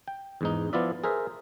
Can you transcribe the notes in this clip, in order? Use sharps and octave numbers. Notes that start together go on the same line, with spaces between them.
G5
E2 G#2 D#4
F3 B3 E4 F4 D5 E5
G#4 A#4 C5 E5